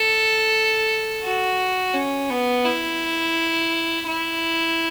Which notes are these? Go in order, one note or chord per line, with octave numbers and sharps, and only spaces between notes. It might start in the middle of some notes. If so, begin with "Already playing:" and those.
Already playing: A4
F#4
C#4
B3
E4
E4